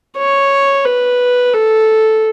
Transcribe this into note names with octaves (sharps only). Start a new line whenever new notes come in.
C#5
B4
A4